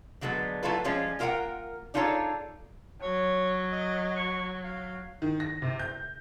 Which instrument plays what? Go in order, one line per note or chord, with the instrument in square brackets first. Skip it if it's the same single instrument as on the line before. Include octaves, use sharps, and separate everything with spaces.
[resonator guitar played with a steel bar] D3 F#3 G#3 A3 B3
F#3 A3 E4 F4 A4 B4
F3 G3 G#3 C#4 F4
A#3 F4 A#4 C#5 F#5 G5
D4 D#4 F4 G#4 A4 C#5
[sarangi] F#3 [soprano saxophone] C#5
[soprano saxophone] D#5
C#6
F5
[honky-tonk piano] D#3
A#6
C3
G6